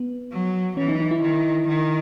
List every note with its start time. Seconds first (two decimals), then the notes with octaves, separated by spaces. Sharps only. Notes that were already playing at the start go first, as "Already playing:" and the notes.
Already playing: B3
0.32 F#3
0.77 E3 C#4
0.88 D#4
1.00 D#4
1.11 E4
1.22 D#3
1.68 D#3